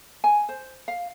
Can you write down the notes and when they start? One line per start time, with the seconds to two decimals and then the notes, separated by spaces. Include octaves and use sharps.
0.24 G#5
0.49 C5
0.88 F5